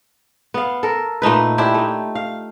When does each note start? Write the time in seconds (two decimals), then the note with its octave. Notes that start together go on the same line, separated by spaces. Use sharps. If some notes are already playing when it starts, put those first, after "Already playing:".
0.54 B3 F5
0.83 A4 A#4
1.22 A#2 A3 D#4 B4
1.58 D4 E4 G4 C5
1.74 A3 D#4
2.15 F5